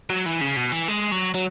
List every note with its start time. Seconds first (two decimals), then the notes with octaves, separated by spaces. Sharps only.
0.10 F#3
0.26 E3
0.41 C#3
0.56 B2
0.72 E3
0.88 G#3
1.11 F#3
1.34 F#3